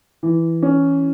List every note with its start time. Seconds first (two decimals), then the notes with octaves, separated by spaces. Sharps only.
0.23 E3
0.63 C#4